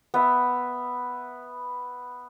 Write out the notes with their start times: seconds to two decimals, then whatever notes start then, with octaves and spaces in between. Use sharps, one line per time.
0.14 B3 E5